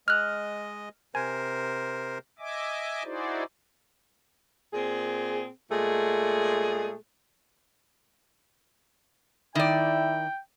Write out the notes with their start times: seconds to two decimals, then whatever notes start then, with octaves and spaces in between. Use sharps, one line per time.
0.08 G#3 D#5 F6 F#6
1.15 C3 A#4 C5 G#5
2.39 D#5 E5 G#5 D6
3.03 D#4 E4 F#4 G#4 C5 D5
4.74 A#2 C4 G#4
5.72 A#2 G#3 A3 G#4
9.55 D#3 E4 D5 G5